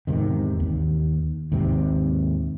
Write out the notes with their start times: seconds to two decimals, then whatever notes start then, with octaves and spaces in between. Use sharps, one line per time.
0.07 E2 G#2 C3 D#3
0.60 D#2
1.52 D#2 G#2 C3 C4